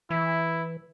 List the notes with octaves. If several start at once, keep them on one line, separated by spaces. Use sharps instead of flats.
E3 E4